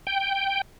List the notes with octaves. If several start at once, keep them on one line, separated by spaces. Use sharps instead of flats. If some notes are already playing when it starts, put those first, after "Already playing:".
G5